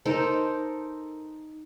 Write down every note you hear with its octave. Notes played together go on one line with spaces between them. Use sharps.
D#4 A4 A#4 C5